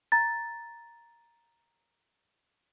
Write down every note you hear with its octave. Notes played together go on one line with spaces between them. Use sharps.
A#5 A6